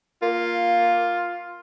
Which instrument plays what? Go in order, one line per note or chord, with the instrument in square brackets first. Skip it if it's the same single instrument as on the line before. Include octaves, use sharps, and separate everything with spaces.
[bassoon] A#3 [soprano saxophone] F4